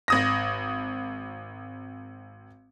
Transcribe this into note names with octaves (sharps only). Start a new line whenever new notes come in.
G#1 D#6 A#6